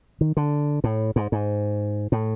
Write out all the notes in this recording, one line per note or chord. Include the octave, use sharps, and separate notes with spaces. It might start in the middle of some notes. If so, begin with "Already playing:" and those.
D#3
D3
A2
G#2
G#2
A2